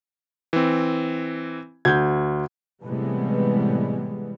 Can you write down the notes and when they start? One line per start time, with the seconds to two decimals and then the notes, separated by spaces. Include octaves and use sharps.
0.53 E3 C4
1.85 D2 G6 G#6
2.83 A2 C3 E3 G3 G#3 B3